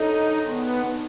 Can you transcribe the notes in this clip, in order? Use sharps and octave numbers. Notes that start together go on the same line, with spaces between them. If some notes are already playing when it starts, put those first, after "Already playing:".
Already playing: D3 F#3 D4 D#4
D#3 G#3 B3 D4